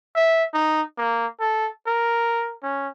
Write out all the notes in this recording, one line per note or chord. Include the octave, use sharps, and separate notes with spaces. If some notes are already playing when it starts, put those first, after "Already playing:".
E5
D#4
A#3
A4
A#4
C#4